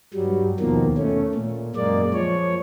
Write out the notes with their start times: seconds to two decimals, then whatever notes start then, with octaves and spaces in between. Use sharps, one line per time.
0.14 G2 F#3 G3
0.60 D#2 B2 D#3 F3 A#3
0.98 A3 C#4
1.35 A#2
1.76 F#2 G#3 A#3 D5
2.14 F3 C#5